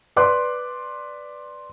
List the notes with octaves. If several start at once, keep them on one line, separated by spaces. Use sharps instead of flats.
B4 D5 C6 D6 F#6